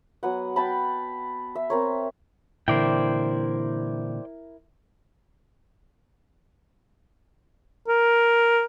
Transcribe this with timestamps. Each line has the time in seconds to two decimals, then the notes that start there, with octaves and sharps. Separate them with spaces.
0.23 F#3 B3 F#5
0.56 F#5 G5 A5 B5
1.55 E5
1.70 C4 A#4 C#5
2.68 A#2 D3 E3 E4 A#4 C5 D5 G5
7.88 A#4